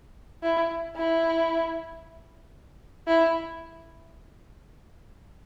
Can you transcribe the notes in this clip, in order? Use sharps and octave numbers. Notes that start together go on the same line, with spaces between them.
E4
E4
E4